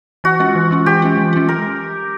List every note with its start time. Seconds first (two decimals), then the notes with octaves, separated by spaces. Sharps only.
0.24 E3 F#4
0.40 G#3 C#4 F4
0.55 E3
0.71 G#3 C#4 F4
0.86 E3 G4
1.02 G#3 C#4 F4
1.18 E3
1.33 G#3 C#4 F4
1.49 G#3 A#4